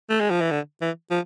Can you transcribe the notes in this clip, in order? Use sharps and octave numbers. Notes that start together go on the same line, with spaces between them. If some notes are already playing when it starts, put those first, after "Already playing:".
A3
G#3
F3
E3
D3
E3
F3